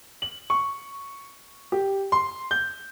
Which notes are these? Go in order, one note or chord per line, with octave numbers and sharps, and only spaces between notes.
F#7
C#6
G4
C6
G6